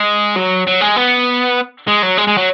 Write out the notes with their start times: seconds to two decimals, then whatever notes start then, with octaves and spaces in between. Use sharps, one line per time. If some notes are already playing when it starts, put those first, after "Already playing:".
Already playing: G#3
0.36 F#3
0.67 F#3
0.81 G#3
0.96 B3
1.87 G#3
2.02 F#3
2.17 G#3
2.27 G#3
2.38 F#3